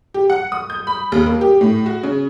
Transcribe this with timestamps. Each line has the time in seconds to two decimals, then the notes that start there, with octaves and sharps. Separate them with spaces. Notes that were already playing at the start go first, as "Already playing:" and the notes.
0.14 G4
0.30 F#5
0.52 D#6
0.70 G6
0.87 B5
1.12 D#2
1.26 A#3
1.41 G4
1.61 A2
1.86 F#4
2.03 C#3